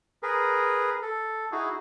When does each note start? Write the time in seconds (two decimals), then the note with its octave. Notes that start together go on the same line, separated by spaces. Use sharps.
0.23 G#4 A#4 B4
1.02 A4
1.52 D#4 E4 F#4 G#4